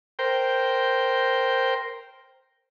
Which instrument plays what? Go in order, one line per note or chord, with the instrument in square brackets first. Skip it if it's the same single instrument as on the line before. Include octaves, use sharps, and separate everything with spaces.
[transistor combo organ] A#4 C5 G5